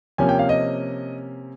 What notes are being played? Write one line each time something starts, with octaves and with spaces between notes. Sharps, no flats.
C3 F3 A#3 C#4 G#5
G5
F5
D#5